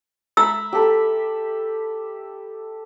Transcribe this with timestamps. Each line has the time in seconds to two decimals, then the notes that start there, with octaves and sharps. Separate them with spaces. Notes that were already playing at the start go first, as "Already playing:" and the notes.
0.37 E5 A#5 B5 E6
0.73 G4 A4 B5